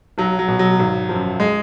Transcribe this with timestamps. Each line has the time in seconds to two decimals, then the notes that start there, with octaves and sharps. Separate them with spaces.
0.18 B1 F#3
0.39 F#3
0.48 B2
0.59 F#3
0.79 G#1
1.09 F#2 F3
1.40 G#3